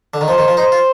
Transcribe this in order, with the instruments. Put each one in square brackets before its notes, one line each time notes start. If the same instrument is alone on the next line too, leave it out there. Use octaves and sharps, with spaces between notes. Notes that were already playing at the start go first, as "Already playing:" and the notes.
[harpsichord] D3
D#3
[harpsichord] F3 [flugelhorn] C5
[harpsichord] D#3
F3
[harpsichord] D#4 [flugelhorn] C5
[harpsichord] F4